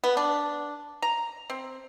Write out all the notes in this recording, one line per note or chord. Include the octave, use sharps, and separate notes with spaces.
B3
D4
A#5
C4